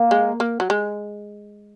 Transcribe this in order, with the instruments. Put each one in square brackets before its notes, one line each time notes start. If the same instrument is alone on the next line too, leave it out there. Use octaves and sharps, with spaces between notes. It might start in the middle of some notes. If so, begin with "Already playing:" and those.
Already playing: [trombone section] A#3
[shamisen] G#3
A#3
F#3
G#3